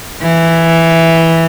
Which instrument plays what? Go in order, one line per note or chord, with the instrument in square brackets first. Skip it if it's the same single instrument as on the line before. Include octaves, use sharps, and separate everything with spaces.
[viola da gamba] E3